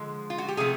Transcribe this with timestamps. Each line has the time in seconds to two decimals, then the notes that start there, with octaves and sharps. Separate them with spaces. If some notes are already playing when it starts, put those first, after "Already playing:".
Already playing: D3 F3 G#3
0.30 F4
0.38 F#4
0.48 G4
0.57 C3 F3 A3 G#4